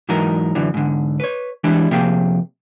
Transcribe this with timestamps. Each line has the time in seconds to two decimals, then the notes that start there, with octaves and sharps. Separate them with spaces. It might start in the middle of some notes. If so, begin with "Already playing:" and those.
0.09 G#2 E3 F#3 D#4 A#4
0.55 F#2 D3 E3
0.74 G#2 D3
1.20 B4 C#5
1.64 E3 G3 G#3 D4 E4
1.91 C3 F3 A#3 G#4 G5